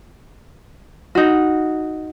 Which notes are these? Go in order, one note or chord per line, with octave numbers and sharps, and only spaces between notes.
D#4 F#4